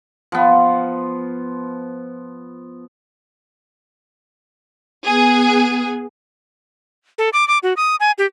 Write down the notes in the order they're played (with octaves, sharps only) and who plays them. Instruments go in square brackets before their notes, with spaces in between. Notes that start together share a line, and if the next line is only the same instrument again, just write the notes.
[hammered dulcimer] F3 B3
[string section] B3 G#4
[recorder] A4
D6
D6
F#4
D#6
G#5
G4